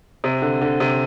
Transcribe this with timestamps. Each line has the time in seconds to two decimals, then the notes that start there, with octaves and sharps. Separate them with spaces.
0.24 C3
0.42 D3
0.61 D3
0.80 C3